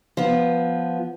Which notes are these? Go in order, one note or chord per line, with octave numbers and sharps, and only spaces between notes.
F3 B3